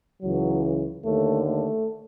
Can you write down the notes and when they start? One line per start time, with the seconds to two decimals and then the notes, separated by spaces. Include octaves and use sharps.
0.22 C#2 C#3 E3 F#3
1.03 D#2 D3 A3
1.44 A3